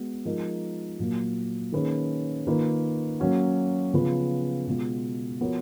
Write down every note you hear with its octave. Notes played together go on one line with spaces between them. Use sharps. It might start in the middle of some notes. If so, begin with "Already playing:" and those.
Already playing: G#3 B3 F#4
F3 G#3 D#4 A#4
A#2 F#3 A#3
D#3 A#3 C#4 G#4 B4
D#3 A#3 F4 B4
F#3 A#3 C#4 F#4
C#3 F3 B3 F4 B4
B2 G#3 B3 F4
F3 B3 F#4 A#4 C#5